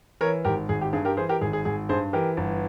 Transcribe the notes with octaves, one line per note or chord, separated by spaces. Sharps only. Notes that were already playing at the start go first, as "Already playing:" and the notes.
E3 A#4 C#5
G#1 G4 A#4
G#1 G#4
G4
G2 G#4
G4 A#4
E3 G#4 C5
G4 A#4
G#1 G#4
G#4
G#1 G#4
G2 G#4 C5
E3 G4 A#4
G1